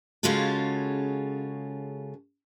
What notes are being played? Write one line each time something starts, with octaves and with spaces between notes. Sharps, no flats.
C#3 G#3 C#4 F4 F#4 A4